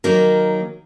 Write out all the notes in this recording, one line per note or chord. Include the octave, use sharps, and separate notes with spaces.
D#3 F#3 A#3 D#4 A#4